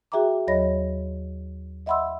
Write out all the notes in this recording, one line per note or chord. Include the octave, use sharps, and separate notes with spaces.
F#4 G#4 E5 G5 A#5 D6
D#2 F#3 C#5 D#5 B5 A#6
D#5 E5 F#5 B5 C6 E6